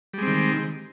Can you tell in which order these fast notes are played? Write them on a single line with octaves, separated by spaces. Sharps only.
G3 G#3 C4 D#3